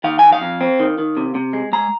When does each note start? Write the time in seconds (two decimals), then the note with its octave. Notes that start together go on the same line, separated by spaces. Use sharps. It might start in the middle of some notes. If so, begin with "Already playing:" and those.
0.04 D#3 F5
0.19 D#3 G#5
0.32 F5
0.41 F2
0.61 C4
0.80 D#3
0.98 D#3
1.17 C3
1.35 C3
1.53 G#3
1.72 G#3 A#5